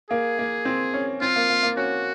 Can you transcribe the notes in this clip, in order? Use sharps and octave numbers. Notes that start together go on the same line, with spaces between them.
A#3 G#4
A#3
C4
C#4
C4 F4
A#3
A#3
A#3
C#4 F#4